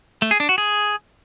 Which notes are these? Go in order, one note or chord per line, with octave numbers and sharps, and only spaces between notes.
A3
G#4
D4
F#4
G#4